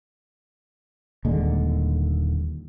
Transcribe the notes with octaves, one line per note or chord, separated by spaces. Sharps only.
D#1 D#2 D3 G#3